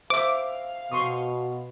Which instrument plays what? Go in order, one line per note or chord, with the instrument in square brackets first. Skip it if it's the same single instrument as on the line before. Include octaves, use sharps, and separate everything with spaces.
[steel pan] C5 E5 [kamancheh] F5 [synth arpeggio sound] D6
[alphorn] B2 [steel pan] C6 C#6 D#6